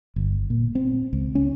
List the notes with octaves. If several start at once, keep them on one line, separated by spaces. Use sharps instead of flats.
G1
A#2
C4
C#2
C#4